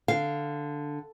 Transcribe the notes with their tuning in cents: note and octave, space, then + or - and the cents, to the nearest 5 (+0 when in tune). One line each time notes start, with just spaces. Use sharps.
D3 +0 F5 -10